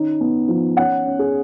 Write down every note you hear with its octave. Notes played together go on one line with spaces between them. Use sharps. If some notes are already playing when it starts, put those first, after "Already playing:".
Already playing: D#3 C#4 D#4
B3
F3
C#4 F#5
C#4
G#4